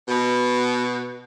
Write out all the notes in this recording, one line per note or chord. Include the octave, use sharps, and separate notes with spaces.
B2